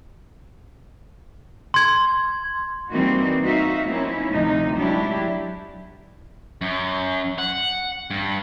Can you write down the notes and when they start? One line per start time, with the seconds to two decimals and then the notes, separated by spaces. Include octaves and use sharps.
1.74 C6 G#6
2.91 E3 G3 A#3 C4 D#4 F#4
3.43 D#4 F#4 E5 F5
3.87 F#3 A#3 C4 C#4 D#4 E4
4.32 D2 C3 F3 C4 D#4
4.75 F#3 G#3 D4 E4 G4
6.61 F#2
7.39 F#5
8.11 G2